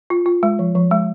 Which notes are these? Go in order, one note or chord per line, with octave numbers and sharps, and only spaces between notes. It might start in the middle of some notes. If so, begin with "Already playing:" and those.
F4
F4
G#3
F3
F3
G#3